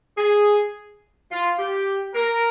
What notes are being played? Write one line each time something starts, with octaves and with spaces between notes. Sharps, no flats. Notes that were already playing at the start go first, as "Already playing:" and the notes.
G#4
F4
G4
A#4